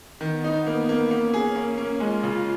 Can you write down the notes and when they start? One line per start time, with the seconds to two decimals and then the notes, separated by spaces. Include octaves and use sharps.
0.21 D#3 B3
0.44 D#4
0.67 A#3
0.89 A#3
1.11 A#3 C#4
1.34 G#4
1.56 A#3
1.78 A#3
2.00 G#3 F4
2.23 C#3